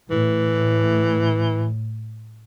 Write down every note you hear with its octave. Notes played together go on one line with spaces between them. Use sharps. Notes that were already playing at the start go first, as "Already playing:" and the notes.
A2 E3